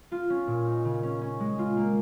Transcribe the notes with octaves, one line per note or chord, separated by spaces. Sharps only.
F4
C#4
A#2
D#4
C#3
C#4
C#4
G#3
F4
A#3